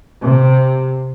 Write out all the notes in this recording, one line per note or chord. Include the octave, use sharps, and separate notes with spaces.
C3